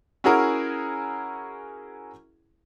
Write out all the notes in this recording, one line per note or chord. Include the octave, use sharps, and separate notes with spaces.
C#4 E4 F#4 G#4 A#4